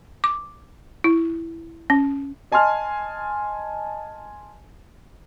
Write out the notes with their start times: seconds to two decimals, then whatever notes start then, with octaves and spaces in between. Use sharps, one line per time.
0.24 D6
1.04 E4
1.90 C#4
2.52 D#5 G#5 A5 C6 F6